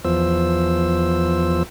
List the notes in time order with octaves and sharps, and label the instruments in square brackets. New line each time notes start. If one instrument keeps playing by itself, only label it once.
[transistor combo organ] E2 F3 C5 E6